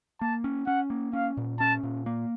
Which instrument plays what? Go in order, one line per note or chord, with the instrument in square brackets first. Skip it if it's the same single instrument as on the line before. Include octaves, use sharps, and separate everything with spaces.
[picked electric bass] A#3 [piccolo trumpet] A5
[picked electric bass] C#4
[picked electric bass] C#4 [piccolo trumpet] F#5
[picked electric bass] A#3
[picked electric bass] C#4 [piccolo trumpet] F5
[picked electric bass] A#2
[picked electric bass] C#4 [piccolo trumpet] A5
[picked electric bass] A#2
A#3